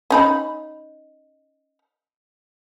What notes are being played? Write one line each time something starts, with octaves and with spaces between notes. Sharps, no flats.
C#4 D#4 B5